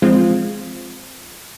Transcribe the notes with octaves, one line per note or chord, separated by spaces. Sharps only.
F3 G#3 C4 F4